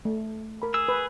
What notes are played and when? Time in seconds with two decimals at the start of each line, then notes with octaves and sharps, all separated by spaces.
0.05 A3
0.62 A#4 B5
0.74 G#4 E6
0.88 B4